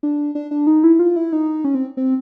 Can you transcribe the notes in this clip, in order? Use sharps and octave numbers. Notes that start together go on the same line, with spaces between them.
D4
D4
D4
D#4
E4
F4
E4
D#4
C#4
C4
C4